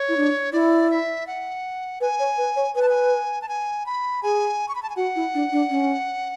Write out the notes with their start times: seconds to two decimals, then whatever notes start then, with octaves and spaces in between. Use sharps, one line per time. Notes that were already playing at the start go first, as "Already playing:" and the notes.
Already playing: C#5
0.09 E4
0.17 D4
0.53 E4 D5
0.91 E5
1.27 F#5
2.01 B4 G#5
2.19 C#5
2.38 B4
2.56 C#5
2.75 B4 G#5
2.82 A5
2.89 G#5
3.42 A5
3.49 G#5
3.86 B5
4.23 G#4 G#5
4.69 C#6
4.75 B5
4.83 A5
4.90 G#5
4.96 F#4 F#5
5.16 E4
5.35 D4
5.52 D4
5.70 C#4